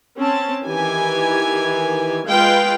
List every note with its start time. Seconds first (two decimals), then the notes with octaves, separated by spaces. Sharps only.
0.17 C4 C#4 A5
0.64 D#3 E3 G4 G#5
2.27 G#3 F4 B4 F5 G5